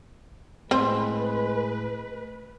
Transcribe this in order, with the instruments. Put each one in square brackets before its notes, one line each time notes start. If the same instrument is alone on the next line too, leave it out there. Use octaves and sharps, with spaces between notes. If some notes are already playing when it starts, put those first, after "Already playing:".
[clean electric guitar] A2 [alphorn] G#3 [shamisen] C4 C5 [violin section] B4